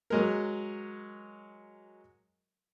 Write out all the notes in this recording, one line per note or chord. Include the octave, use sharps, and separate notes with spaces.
F#3 G#3 A#4